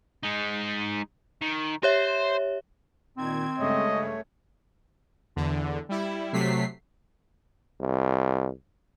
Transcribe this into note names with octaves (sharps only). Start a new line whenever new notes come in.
G#3 D#4
D#3
G4 C5 C#5 E5
A#2 D#3 C4 G#6
G2 C#3 G#3 A3 C#5 D#5
E2 D3
G3 E4
C3 F#3 A3 B6 C7
C2